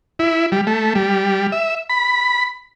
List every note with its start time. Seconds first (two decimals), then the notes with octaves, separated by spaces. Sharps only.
0.19 E4
0.52 G3
0.67 A3
0.95 G3
1.52 E5
1.90 B5